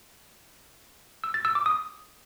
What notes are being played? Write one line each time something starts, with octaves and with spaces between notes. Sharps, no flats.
E6
A6
E6
D6
D#6